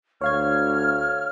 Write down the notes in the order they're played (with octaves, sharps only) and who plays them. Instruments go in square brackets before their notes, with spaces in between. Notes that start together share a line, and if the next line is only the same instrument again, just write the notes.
[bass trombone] D2 [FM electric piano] C#5 F5 G#6 [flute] F6